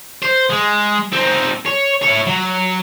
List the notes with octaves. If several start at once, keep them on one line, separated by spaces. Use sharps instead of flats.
C5
G#3
C4 D#4
C#5
E4 C#5
F#3